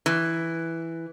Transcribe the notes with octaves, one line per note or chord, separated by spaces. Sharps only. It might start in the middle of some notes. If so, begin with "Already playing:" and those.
E3